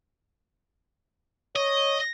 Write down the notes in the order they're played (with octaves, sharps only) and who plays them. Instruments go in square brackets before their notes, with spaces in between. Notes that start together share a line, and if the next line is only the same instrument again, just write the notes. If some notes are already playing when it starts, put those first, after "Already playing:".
[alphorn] C#5 [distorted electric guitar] D#5